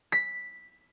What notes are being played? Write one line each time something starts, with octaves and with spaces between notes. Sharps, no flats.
B6